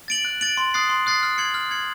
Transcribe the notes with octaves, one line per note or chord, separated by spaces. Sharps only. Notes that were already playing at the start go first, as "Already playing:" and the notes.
A6 D7 F#7
F#6
A6 D7 F#7
C6
D#6 F#6 A6 C7
C6
D#6 F#6 A6 C7
F6
G#6 C#7 F#7
F6
G#6 C#7 F#7